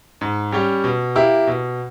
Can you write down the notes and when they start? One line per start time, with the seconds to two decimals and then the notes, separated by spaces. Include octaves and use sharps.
0.21 G#2
0.52 G3 C#4 G4
0.84 B2
1.15 A#3 E4 G4
1.47 B2